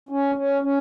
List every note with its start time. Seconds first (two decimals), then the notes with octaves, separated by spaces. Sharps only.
0.09 C#4
0.35 C#4
0.62 C#4